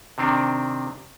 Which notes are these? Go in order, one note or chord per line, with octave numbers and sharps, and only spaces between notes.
C3 D#3 C4 D4